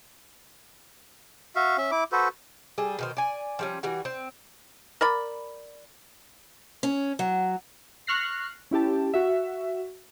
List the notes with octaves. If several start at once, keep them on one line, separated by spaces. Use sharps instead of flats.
F#4 E5 F5
C#4 E5
E4 D6
F#4 A4 B4 C5
G3 G#4 A4
B2 D#3 C5
D5 G#5
F3 G3 C#4
E3 G3 F#4
C4
A#4 D5 B5
C#4
F#3
C#6 F6 F#6 A#6 C7
C#4 E4 G4 A5
F#4 E5